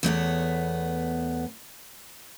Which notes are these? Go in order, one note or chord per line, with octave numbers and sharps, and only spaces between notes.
E2 A3 B3 C#5